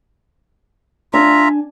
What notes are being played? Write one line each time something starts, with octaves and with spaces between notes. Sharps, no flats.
D4 F4 E5 G#5 A#5